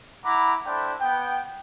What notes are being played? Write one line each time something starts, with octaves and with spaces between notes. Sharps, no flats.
E4 F#5 A#5 B5 D6
A3 D4 E4 C5 G5
B3 G5